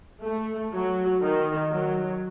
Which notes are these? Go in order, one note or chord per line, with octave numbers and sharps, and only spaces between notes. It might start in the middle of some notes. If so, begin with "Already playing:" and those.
A3
F#3
D#3
F#3